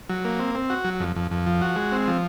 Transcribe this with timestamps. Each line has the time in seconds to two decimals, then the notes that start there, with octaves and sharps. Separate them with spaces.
0.09 F#3
0.25 A#3
0.39 C4
0.55 C4
0.70 F#4
0.84 F#3
1.00 F2
1.16 F2
1.31 F2
1.47 F3
1.61 F#4
1.76 G#3
1.92 C4
2.07 F3